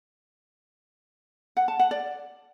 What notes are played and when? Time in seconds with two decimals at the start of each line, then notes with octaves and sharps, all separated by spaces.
1.57 F#5
1.68 A5
1.79 F#5
1.91 D5